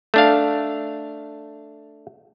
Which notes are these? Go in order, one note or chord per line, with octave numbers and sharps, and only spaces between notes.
A3 D4 F5